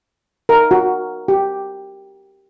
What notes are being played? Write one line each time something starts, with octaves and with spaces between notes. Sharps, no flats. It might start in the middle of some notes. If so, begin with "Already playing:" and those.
A#4
F#4
G4